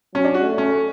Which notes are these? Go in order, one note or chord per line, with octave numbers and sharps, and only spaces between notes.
F#3 C#4
D4
F#4
A3
C#4